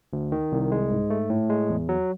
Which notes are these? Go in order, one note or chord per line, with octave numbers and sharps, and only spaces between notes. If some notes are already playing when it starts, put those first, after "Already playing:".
D2
D#3
C2
G#3
G#2
A3
A2
G#3
E2
F#3